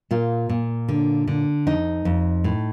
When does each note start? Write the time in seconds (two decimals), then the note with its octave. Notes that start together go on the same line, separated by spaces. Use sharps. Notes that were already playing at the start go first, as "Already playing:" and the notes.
0.11 A#2 F4
0.49 A#2
0.88 D3
1.27 D3
1.67 F2 D#4
2.05 F2
2.44 A2